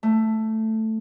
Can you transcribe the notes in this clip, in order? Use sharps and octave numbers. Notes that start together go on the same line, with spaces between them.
A3